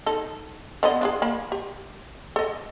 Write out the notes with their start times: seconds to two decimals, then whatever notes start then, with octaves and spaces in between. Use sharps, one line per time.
0.06 D#4 A4
0.83 D3 B3 D#5
1.01 D4 F4 G#4
1.22 A#3 B5
1.52 G4
2.36 A4 D#5